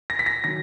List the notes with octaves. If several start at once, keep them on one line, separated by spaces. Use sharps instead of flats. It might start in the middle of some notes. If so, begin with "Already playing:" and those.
A#6
B6
A#6
D#3 F#3 A#6